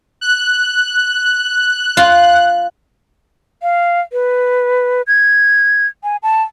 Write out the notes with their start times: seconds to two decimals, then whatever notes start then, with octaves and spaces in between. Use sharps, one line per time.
0.21 F#6
1.97 F4
3.62 F5
4.13 B4
5.07 G#6
6.04 G#5
6.23 A5